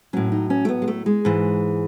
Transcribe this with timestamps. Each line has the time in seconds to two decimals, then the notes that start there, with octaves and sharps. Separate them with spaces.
0.13 A2 F#3 C#4
0.32 D#4
0.50 C#4
0.65 A3
0.68 B3
0.82 G#3
0.88 A3
1.06 G#3
1.25 G#2 E3